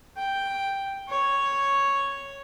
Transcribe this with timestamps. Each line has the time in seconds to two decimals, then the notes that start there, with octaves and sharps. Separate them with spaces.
0.17 G5
1.08 C#5